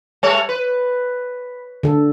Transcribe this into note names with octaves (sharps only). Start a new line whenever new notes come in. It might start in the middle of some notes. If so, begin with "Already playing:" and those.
G3 A3 C#5
B4
D3 A4